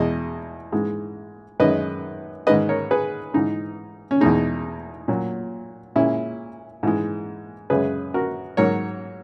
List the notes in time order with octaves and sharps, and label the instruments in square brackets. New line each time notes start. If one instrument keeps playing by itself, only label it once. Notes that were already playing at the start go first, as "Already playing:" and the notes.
Already playing: [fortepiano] E2 B2 G#3 D#5
G#2 E3 G#3
F#2 D#3 G#3 B4 D#5
G#2 D#3 G#3 B4 D#5
A#4 C#5
G#4 B4
G#2 E3 G#3 D#4
C#4
E2 B2 G#3 D#4
A#2 F#3
A#2 G#3 C#4 E4
G#2 E3 G#3
F#2 C#3 G#3 G#4 B4
F#4 A#4
G#2 F#3 A#4 C#5